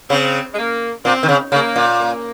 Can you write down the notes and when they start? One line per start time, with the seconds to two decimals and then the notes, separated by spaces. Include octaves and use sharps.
0.10 C#3 C4
0.53 G#3
0.58 A#3
1.05 A#2 C4
1.23 D#3
1.29 C#3
1.52 C#3 A#3
1.76 A#2
1.99 A#3